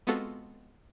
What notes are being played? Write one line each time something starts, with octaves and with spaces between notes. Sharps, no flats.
G#3 B3 C4 F4 F#4 A4